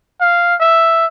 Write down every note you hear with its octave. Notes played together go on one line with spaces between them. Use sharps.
F5
E5